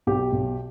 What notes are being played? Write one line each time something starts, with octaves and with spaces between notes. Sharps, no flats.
B1 G4
B1